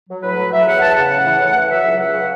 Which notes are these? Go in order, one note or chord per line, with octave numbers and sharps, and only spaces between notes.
F#3
A2 B4
F#3
F#3 E5
E2 F#5
E2 A5
C#3 F#5
A2
E3
A2
E3
F#3 E5
C#2
C#2 F#5
C#3